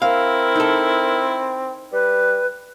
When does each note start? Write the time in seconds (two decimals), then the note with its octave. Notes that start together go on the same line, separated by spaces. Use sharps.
0.02 C4 E4 A#4 F5
0.56 D#4 A4
1.92 G3 B4